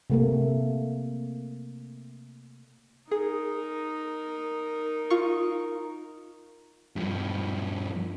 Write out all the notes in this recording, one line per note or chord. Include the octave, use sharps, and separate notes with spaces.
C3 A3 A#3
D#4 G#4 A#4
F4 C#6
G2 F3